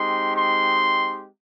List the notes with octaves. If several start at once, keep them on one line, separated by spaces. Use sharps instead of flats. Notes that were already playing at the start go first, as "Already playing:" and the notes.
Already playing: G#3 C4 D#4 G4 C6
C6